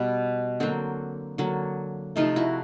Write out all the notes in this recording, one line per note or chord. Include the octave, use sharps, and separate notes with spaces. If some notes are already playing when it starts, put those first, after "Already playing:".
Already playing: B2 G3 B3
D3 F#3 A#3 C4
D3 F#3 A#3
C3 F3 A3 D#4 F4
E4 F#4